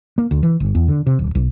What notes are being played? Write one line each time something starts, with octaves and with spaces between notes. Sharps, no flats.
A#3
D2
E3
G1
E2
D3
C3
D1
B1